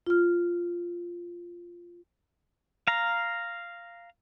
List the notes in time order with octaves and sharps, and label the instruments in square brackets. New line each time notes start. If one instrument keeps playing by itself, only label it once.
[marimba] F4 F6
[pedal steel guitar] F5 A#5